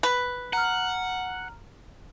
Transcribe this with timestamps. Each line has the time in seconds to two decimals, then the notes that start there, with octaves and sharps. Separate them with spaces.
0.03 B4
0.53 F#5 A#5 F6